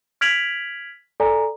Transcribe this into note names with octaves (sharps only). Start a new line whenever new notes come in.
F6 G#6 B6 D7 F7 F#7
A4 D5 G#5 A#5